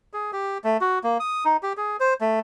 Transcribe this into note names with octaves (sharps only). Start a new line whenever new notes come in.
G#4
G4
A3
F#4
A#3
D#6
D#4
G4
G#4
C5
A3